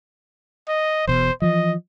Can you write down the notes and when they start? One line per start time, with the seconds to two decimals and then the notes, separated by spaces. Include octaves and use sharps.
0.68 D#5
1.07 E1 E2 B2 C5
1.42 E3 F3 D#5